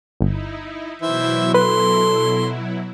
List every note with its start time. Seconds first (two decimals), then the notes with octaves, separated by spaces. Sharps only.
0.21 G1 D#4 E4
1.02 B2 E3 F#3 E4 C5 E5
1.54 A4 B4 C6